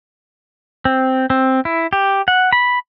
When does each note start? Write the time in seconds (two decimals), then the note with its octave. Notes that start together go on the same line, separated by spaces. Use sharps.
0.85 C4
1.30 C4
1.65 E4
1.93 G4
2.28 F#5
2.53 B5